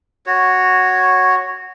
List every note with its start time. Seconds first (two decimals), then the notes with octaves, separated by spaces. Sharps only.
0.26 F#4 C#5